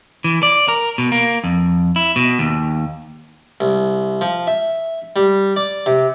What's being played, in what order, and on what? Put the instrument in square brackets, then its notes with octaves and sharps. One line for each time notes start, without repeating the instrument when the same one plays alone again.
[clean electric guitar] E3
D5
A#4
B2
A#3
F2
E4
B2
D#2
[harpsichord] C2
F3
E5
G3
D5
C3